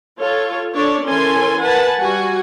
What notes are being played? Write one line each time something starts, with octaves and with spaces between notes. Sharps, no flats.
F4 A4 C#5
D4 A4 C#5 D5
E3 C#4 A4 A#4 G#5 C6
A#4 B4 F#5 G#5 A5
G3 F#4 F#5 G#5